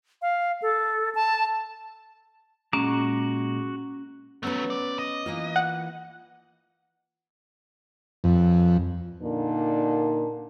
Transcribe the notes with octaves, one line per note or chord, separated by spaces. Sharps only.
F5
A4
A5
A#2 G#3 C#4 F#4 A#5 D6
F#3 A3 B3 C#4 B4
D5
D#5
E3 A#3 F4
F#5
F2
A#2 D3 D4 D#4 A#4